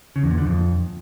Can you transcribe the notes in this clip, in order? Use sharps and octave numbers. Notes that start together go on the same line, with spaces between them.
C#3
E2
A#2
D3
F2